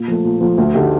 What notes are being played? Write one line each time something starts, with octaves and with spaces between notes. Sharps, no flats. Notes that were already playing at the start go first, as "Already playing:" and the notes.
Already playing: A#2
F3 A3
A#2
F3 A3
D2
D3 A3 D#4 G4